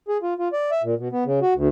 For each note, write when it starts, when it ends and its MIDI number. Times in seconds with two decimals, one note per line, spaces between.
0.08 0.18 68
0.22 0.34 65
0.39 0.48 65
0.53 0.71 74
0.71 0.82 76
0.83 0.95 46
0.99 1.08 47
1.12 1.24 59
1.25 1.39 49
1.42 1.54 66
1.55 1.68 38